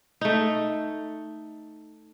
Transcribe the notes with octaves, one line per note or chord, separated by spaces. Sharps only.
A3 D#4